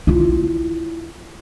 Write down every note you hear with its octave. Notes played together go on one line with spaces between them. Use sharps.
E4 F4